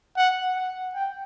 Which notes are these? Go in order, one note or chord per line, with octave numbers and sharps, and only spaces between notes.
F#5
F#5
G5